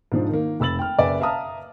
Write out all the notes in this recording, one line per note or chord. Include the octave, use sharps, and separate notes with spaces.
G#2 F3 D4
D#3 A#3
F1 B5 E6 A6 F#7
G5 F6
F#1 B4 D5 E5 G#5
E5 F5 A5 A#5 D#6 F6